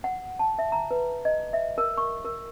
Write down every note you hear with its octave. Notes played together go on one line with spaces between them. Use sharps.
F#5
A5
E5
A#5
B4
D#5
E5
A#4
C#6
A#4